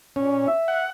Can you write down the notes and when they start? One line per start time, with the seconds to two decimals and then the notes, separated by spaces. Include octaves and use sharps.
0.16 A#2 C#4
0.47 E5
0.68 F#5